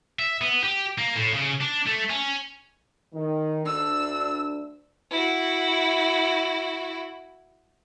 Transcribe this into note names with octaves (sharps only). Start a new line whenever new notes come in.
E5
B3
G4
A#3
A2
C#3
D4
A3
C#4
D#3
D2 D4 E6
E4 F#4